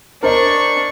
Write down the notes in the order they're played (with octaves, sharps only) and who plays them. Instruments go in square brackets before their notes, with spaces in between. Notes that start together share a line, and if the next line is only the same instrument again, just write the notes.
[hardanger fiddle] D4 C#6 [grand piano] A#4 C5 D#5